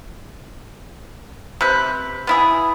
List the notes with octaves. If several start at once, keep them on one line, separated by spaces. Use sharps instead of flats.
C3 B4
B3 E4 G#4